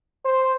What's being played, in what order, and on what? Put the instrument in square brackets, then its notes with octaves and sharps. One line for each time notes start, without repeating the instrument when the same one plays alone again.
[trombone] C5